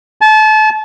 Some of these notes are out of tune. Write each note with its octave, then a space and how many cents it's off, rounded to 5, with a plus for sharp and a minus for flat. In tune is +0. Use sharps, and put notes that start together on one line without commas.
A5 -30